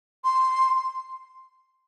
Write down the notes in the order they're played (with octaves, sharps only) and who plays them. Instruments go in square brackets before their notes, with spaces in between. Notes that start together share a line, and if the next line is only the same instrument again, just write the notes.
[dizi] C6